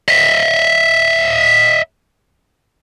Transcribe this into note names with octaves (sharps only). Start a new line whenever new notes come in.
D#5 E5